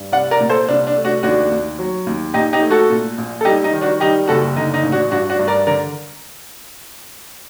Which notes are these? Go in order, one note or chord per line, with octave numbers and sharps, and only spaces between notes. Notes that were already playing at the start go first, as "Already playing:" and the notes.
Already playing: G2
C2 D5 F#5
A#4 D5
A#2
A4 C5
C2 D4
D4
A3
D4 F#4
D#2 D4 F#4
D#2
F#3
D#2
A#1 D#4 G4
D#4 G4
A3
F#4 A4
A#2
A#1
A4
G3 D#4 G4
D#4
D#3
D4 F#4
G3 D#4 G4
F#1 F#4 A4
D3 D#4
D#4
A1
D4 F#4
G2 D4 F#4
D4 F#4
G2
A#4 D5
D3 A#4 D5